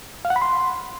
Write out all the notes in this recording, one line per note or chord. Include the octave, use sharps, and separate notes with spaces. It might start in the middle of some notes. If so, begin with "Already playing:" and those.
F5
F#5
B5
C6